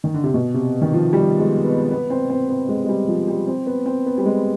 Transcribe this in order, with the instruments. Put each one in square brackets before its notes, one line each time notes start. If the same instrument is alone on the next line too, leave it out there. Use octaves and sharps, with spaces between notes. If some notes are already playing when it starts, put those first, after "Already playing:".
[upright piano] D#3
D3
C3
B2
C3
D#3
F3
G3
G#3
B3
B3
C4
C4
B3
G#3
G#3
G3
F3
G3
C4
B3
C4
B3
G3
G#3